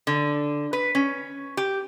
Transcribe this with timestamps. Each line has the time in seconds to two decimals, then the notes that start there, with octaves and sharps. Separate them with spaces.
0.07 D3
0.73 B4
0.95 C#4
1.57 G4